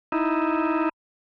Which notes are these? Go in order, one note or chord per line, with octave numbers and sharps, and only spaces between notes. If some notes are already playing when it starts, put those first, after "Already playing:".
D#4 E4